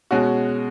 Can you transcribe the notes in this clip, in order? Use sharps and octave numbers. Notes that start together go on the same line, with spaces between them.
B2 G#3 C#4 F#4